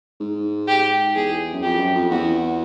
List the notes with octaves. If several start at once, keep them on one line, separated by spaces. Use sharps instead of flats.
G#2
G4
E2 G#4
F#2
F2 G4
F#2
F2
E2 F#4